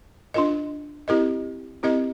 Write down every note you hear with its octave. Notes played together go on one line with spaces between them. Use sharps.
D4 F4 A#4 D#5
C4 E4 G4 A#4 D#5
C4 E4 G4 A#4 D#5